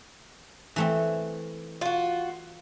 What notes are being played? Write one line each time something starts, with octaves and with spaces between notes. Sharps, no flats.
E3 A3 C4
F4 F#4